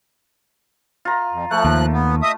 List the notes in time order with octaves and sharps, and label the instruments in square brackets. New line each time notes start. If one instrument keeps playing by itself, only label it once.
[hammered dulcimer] F4 A#5
[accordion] F2
[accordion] F3 F#6 [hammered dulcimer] A3
[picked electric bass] D#2
[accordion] B3
D#5 E5 D#6